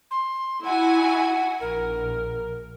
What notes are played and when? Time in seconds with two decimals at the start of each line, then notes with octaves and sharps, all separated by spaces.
0.11 C6
0.65 E4 F#4 F#5 G#5
1.61 A#1 A#4